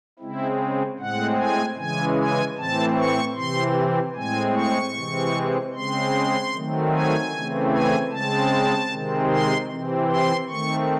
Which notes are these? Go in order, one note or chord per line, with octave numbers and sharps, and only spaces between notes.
C#3 G#3 C4 E4
A2 G#3 C4 F#5
G#5
C#3 E3 G#3 G#5
G#5
A2 E3 C4 A5
C#6
C3 E3 C4 C6
A2 G#3 C4 G#5
C#6
C3 E3 G#3 C4
C#3 G#3 C4 C6
D#3 F#3 A3 C4
G#5
C#3 E3 A3 C4
G#5
C#3 G#3 C4 A5
C3 D#3 G#3 C4
C6
C3 E3 C4
C6
D#3 A3 C4 C#6